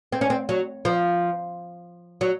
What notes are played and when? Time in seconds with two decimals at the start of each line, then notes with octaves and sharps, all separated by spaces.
0.12 C4
0.21 C#4
0.30 C4
0.49 F#3
0.85 F3
2.21 F#3